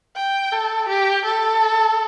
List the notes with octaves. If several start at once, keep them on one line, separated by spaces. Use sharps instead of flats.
G5
A4
G4
A4